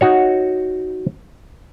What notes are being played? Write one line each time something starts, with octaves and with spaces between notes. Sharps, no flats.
D#4 F#4 C#5